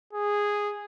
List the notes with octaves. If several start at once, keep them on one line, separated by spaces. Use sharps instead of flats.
G#4